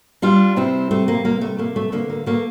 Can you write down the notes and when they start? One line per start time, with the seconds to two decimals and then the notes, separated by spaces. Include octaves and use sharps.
0.22 G3 D4 F4
0.56 C3 C4 E4
0.91 G3 A3 C4
1.08 A#3
1.24 C3 A#3
1.41 A3
1.59 A3 A#3
1.76 A3
1.92 D3 A#3
2.10 A#3
2.26 A3 A#3